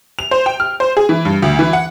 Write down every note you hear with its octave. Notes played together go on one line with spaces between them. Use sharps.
F7
C5
G5
F6
C5
G#4
E3
G2
D2
E3
F#5